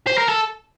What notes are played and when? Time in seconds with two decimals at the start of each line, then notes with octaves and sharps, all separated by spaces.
0.07 C5
0.18 A#4
0.29 A4